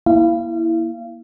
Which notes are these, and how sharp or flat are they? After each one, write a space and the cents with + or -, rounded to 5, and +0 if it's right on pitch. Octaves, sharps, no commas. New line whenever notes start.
A#3 +35 E4 +0 F5 -30